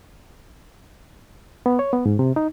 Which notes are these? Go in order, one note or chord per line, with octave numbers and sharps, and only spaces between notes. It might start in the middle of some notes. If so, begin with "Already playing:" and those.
B3
C#5
B3
G#2
C3
D#4